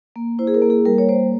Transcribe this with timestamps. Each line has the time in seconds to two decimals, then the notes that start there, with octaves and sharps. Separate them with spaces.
0.16 A#3
0.39 E4 C5
0.47 G#4
0.54 A#4
0.62 A#3
0.70 G#4
0.85 G3 A#4
0.98 C#5
1.09 A#3 C5